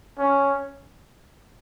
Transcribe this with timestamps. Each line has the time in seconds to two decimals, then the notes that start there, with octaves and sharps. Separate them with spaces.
0.19 C#4